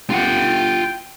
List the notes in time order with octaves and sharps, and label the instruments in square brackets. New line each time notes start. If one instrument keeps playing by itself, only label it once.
[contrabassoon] G1 [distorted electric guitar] F4 F#5 [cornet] G5